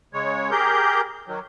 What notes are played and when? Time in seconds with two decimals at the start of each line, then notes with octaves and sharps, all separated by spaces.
0.14 C#3 G#3 C#5
0.51 G4 G#4 A#4 G6
1.28 D#3 F#3